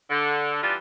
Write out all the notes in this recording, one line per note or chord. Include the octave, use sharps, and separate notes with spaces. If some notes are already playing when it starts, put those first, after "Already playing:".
D3
E3 G3 D4 F4